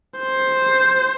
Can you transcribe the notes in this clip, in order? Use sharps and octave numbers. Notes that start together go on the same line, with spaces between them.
C5